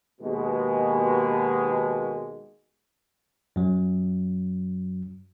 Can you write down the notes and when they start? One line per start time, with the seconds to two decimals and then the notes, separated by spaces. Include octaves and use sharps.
0.21 D#2 B2 G#3
3.56 F#2 F#3